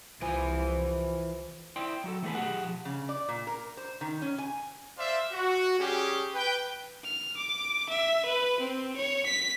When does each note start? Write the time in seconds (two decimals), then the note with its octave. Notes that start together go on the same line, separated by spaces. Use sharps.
0.21 C2 E3 F3 G#5
1.76 E4 C5 D5 G5 C6
2.04 F#3 F#4 A4
2.22 E3 A3 B3 D4 G#4 B4
2.35 B1 G4 G#4 F#5
2.65 F3
2.85 C#3
3.09 D5
3.29 A#2
3.47 A#4
3.77 C5
4.01 D#3
4.22 C#4
4.38 G#5
4.97 C5 D5 E5 F5 C6
5.33 F#4
5.79 G3 C#4 G4 G#4
6.34 B4 G5
7.04 F6
7.37 D6
7.89 E5
8.25 B4
8.60 C4
8.96 C#5
9.26 B6